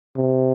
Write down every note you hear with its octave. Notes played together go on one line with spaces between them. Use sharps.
C3